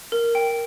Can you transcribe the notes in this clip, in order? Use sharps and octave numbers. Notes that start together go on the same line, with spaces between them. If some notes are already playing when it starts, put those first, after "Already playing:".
A#4
G5